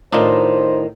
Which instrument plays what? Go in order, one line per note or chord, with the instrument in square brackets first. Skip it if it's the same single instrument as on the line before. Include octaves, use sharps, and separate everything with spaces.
[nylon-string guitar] A2 D#3 [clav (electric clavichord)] D4 D#4 F4 [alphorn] C5